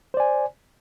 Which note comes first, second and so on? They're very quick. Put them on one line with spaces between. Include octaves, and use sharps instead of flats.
C5 D5 G#5